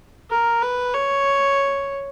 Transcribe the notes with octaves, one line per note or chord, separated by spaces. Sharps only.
A#4
B4
C#5